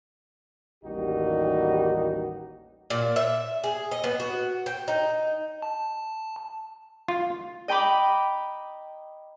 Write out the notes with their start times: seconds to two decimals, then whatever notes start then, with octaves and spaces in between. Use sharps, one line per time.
0.84 A1 D#2 G3 D#4 F#4 G4
2.90 A#2
3.16 E5
3.64 G#4
3.91 D#5
4.04 B3
4.20 F#4
4.66 G5
4.88 D#4
5.62 A5
7.08 F4
7.68 D#5 G5 A#5 B5 D6